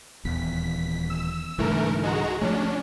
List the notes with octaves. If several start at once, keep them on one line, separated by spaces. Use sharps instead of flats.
D#1 E2 B6
E6
C2 G#2 D3 E3 A3 A#4
G#3 F#4 A#5
F3 F#3 A3 C#4 D4